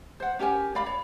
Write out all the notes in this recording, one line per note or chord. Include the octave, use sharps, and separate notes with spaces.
C5 F#5
C#4 G4 A#4 G#5
D5 F5 B5
C#5